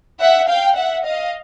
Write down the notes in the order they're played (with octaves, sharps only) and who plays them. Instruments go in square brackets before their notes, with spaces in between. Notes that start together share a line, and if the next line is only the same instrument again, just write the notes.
[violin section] E5 F#5
F5 G5
E5 F#5
D#5 F5